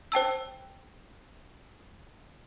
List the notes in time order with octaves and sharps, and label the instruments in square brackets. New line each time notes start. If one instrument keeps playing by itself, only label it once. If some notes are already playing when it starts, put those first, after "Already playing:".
[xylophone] C5 G5 A5 E6